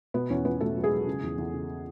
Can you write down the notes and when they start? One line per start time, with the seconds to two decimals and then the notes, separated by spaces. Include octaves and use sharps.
0.14 B2 B3 B4
0.30 E2 C#4 C#5
0.45 E2 B3 B4
0.61 B2 A3 A4
0.76 F#3
0.84 G#3 G#4
0.92 F#3
1.07 C#3
1.23 E2
1.38 E2
1.54 C#3